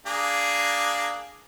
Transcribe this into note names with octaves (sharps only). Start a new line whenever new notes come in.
A#3 D4 G#4